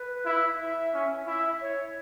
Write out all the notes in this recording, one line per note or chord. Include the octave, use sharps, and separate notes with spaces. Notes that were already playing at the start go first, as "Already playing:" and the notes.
Already playing: B4
E4
E5
C#4
E4 E5
C#5